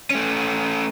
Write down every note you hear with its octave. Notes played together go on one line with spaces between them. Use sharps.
A3 C#4